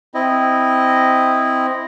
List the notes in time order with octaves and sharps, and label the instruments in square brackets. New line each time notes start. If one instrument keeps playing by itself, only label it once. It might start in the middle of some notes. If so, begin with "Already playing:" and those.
[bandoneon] C4 E4 D#5